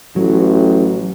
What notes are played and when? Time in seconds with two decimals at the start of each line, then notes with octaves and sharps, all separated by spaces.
0.16 A1 F#3